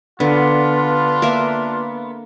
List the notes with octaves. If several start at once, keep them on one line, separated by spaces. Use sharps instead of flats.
D3 B3 D4 F4
A#3 A#4 E5